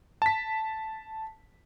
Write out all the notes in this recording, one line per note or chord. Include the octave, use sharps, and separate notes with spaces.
A5 B6